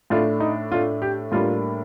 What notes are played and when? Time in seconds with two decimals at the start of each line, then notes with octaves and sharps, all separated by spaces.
0.10 A2 A3 D4 F4
0.40 D#4
0.72 A2 A3 D4 F4
1.02 G4
1.32 A2 G3 A#3 D4 F4